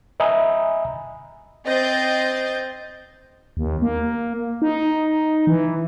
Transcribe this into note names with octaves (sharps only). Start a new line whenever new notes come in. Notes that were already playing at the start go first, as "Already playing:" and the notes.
D#5 E5 G#5 A#5 B5 D#6
C4 D#5 G6 A6 C7
D#2
A#3
D#4
E3